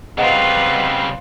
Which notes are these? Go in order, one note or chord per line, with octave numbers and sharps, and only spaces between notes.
C#3 G3 C4 F4 B4 D#5 F#5